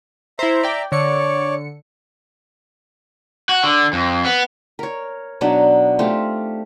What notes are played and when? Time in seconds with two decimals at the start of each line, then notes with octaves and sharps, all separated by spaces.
0.39 E4 C5 E5 A#5
0.63 D5 G5
0.92 D3 C#5 D5 C#7
3.49 F#4
3.64 D3
3.93 F2
4.25 B3
4.79 A#4 C#5
5.41 B2 F#3 D4 D#4
5.99 A3 C4 F4 G4